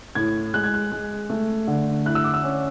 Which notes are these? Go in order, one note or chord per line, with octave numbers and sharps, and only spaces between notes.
A2 G#6
G#3 F#6
G#6
F#6
G#3
A3
D3
E4 F#6
E6
D6
E6
C#4